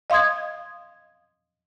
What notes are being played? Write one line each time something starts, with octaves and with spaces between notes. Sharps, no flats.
D#5 F5 C6 D#6 G#6